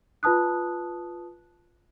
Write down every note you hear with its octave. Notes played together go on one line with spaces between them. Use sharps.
F4 B4 A5 D#6 F#6